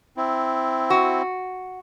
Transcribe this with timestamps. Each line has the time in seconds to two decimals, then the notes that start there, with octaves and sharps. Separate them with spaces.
0.17 C4 E4
0.90 F#4